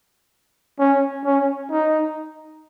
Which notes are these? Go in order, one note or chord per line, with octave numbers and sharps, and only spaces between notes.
C#4
C#4
D#4